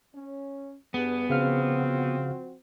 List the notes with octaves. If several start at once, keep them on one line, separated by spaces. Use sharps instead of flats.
C#4
G2 B3 G#4
C#3 F3 C4 F#4 F5 F6